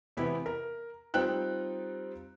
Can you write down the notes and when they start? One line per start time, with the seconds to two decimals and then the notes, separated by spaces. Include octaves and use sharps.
0.17 C3 E3 B3 E4 G4
0.46 A#4
1.14 G3 C4 D#4 F4 G5 F#6